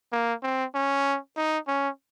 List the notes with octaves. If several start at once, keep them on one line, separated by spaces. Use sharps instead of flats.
A#3
C4
C#4
D#4
C#4